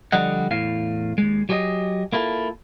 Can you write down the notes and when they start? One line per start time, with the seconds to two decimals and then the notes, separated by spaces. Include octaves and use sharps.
0.12 D3 F3 G3 D#5 F#5
0.51 E2 A2 F5
1.18 D#2 G#3
1.49 F#3 G4 G#4 D5 D#5
2.13 A#3 E4 F4 A4